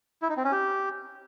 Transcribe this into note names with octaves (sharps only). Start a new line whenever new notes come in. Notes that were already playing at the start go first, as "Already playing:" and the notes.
E4
D#4
C4
C#4
G4